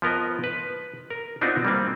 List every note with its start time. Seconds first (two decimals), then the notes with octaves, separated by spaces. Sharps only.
0.02 F3 B3 A#4 D#5
0.44 B4
1.10 A#4
1.41 B3 C4 D4 D#4 F4 F#4
1.65 G3 A#3 C4